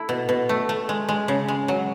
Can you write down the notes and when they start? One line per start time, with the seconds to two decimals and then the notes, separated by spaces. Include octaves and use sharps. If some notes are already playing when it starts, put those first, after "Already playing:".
Already playing: A3 E4
0.09 B2
0.29 B2
0.49 A3
0.69 A3
0.89 G#3
1.09 G#3
1.28 C#3
1.48 G#3
1.68 F#3